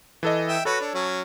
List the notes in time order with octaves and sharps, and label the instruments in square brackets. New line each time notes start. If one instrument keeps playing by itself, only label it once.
[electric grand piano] E3 A4 D#5
[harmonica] E5 G5
[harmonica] F#4 B4 [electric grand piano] A4 C#5
[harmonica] D4
F#3 C#4